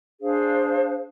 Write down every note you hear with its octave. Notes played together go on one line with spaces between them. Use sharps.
D4 G#4 C5 F5